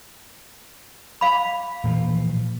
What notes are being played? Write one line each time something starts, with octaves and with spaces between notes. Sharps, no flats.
F5 B5
A#2 E3 F3